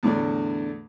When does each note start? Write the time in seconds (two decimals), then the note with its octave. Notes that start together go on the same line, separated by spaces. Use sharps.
0.03 E2 A2 D3 D4